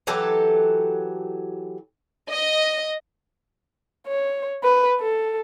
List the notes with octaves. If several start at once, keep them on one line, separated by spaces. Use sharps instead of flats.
E3 F#3 G4 A4
D#5
C#5
B4
A4